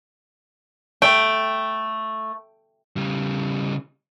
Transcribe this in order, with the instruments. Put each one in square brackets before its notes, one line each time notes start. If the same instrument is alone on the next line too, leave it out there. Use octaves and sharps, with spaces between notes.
[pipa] A3 [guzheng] G5
[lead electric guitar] C#3 G3